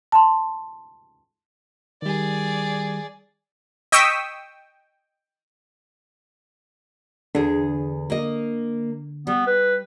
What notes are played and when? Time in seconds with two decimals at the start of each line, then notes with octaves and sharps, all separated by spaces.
0.12 A5 C6
2.02 D#3 G3 G#4 D5
3.92 D#5 G5 C#6 D#6 E6 B6
7.35 E2 D3 G#4
8.10 A#3 D#5
9.27 G3 B3
9.47 B4